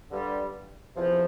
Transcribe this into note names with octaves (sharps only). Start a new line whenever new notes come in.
G2 D3 G3
E2 C3 F3